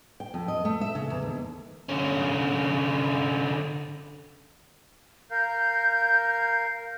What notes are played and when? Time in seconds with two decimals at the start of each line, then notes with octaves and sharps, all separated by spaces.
0.20 G5
0.34 F2
0.48 D#5
0.65 A3
0.81 E5
0.95 C#3
1.10 E2
1.22 D#2
1.89 D3 C#4
5.31 A#4 F5 G6